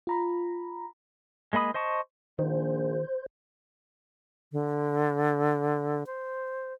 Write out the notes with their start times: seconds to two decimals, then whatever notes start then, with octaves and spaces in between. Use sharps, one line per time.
0.07 F4 A#5 B5
1.53 G#3 A#3 D#5 B5 D#6
1.74 C5 D#5 A5 C#6
2.39 A#1 D#3 C5
4.52 D3
6.06 C5